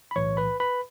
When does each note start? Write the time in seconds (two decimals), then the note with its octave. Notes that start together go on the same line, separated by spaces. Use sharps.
0.11 B5
0.16 B1 A2 E3 C#5 C#6
0.37 B4 B5
0.60 B4 B5